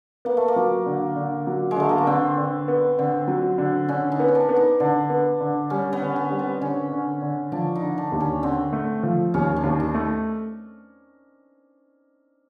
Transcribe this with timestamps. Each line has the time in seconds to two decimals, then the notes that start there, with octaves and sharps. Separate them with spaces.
0.25 A#3 B3
0.37 A3
0.48 A#3
0.56 F#3
0.86 D3
1.16 D3
1.47 F#3
1.71 G#3
1.76 D3 A3
1.89 A#3
1.98 B3
2.07 D3 C4
2.38 D3
2.68 B3
2.99 D3 C4
3.28 F#3
3.58 D3
3.88 D3 C#4
4.12 D#4
4.20 B3
4.28 C#4
4.35 D4
4.49 B3
4.56 D#4
4.80 D3 D4
5.10 B3
5.40 D3
5.70 G3 C#4
5.93 B3
6.01 D3
6.16 B3
6.31 G3
6.39 C4
6.61 D3 C#4
6.92 D3
7.22 D3
7.52 F3 D4
7.75 D#4
7.82 D3
7.98 D4
8.12 D#2
8.20 C#4
8.43 D3 C4
8.73 A3
9.03 F3
9.34 D#2 C#4
9.56 D4
9.64 D#2
9.80 D#4
9.94 A3